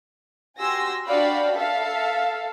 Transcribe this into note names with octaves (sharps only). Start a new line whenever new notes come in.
F#4 G4 G#5 C6 E6 A#6
D4 F#4 D5 F5 G5 B5
A4 E5 F5